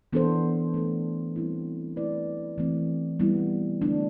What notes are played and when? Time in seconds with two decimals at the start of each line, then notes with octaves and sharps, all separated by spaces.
0.13 E3 B3 D4 A4 C5
0.74 A3 D4 A4
1.36 G3 C4 E4
1.96 A3 E4 B4 D5
2.58 E3 A3 C4
3.20 G3 B3 E4
3.82 D3 A3 D4